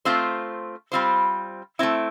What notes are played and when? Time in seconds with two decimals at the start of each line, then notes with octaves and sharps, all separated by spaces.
0.05 A3 C4 F4 C5
0.92 G3 C4 F4 C5
1.79 A3 C4 E4